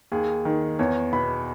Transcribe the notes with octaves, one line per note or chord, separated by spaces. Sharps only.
D#2 G#4
D#3
E2 C#5
B2 B5